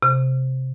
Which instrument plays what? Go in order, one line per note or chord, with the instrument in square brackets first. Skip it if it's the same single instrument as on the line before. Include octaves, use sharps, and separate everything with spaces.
[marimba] C3